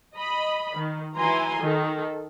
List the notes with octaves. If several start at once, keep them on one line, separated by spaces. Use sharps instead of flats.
D#5 B5
D#3
E3 F#3 E4 G#5 A#5 C6
D#3 A4